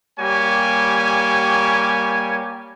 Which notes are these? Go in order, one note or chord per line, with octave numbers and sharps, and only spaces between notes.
G3 A#3 G4 C#5 G#5